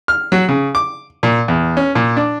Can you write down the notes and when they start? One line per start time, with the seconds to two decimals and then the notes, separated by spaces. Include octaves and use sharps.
0.08 F6
0.32 F#3
0.49 C#3
0.75 D6
1.23 A#2
1.48 E2
1.77 C#4
1.95 A#2
2.17 D4